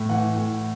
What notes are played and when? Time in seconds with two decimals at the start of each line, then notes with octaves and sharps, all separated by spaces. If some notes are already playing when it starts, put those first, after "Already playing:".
Already playing: A2
0.09 E3 F#5
0.36 A2